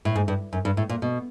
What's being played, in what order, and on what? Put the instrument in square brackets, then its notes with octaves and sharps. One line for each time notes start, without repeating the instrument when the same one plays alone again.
[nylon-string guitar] A2
G#2
G2
F#2
G2
A2
A#2
B2